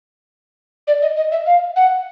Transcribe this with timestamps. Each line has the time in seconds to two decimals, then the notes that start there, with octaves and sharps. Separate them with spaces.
0.88 D5
1.02 D#5
1.16 D#5
1.32 E5
1.46 F5
1.76 F#5